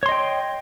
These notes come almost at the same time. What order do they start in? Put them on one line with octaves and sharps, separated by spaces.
C#5 C6 D#5 G5